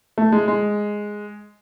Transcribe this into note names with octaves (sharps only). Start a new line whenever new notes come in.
A3
G#3
G#3